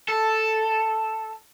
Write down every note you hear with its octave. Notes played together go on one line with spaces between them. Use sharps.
A4